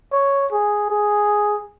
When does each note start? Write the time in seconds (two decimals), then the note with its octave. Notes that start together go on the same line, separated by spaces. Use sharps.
0.12 C#5
0.52 G#4
0.90 G#4